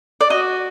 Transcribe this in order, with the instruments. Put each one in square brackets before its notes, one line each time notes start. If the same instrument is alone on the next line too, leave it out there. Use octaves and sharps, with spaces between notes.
[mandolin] D5
[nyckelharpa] F#4 [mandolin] D#5